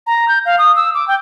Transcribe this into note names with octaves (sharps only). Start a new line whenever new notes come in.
A#5
G6
F5
D#6
E6
D6
G5